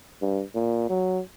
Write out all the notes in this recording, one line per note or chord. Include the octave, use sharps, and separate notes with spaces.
G2
A#2
F#3